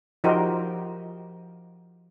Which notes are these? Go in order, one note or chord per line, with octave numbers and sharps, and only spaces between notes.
F3 D#4 F#4 G4 A#4 C5